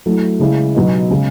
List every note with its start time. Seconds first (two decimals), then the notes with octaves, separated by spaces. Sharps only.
0.06 F#3 A3 E4
0.40 C#3 G#3 C#4 E4
0.75 B2 F#3 B3 D#4
1.11 C#3 G#3 C#4